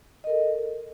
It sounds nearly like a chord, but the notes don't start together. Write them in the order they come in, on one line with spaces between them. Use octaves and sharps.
D#5 A#4 A4